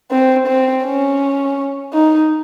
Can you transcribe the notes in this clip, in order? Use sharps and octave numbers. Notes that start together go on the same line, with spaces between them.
C4
C4
C#4
D#4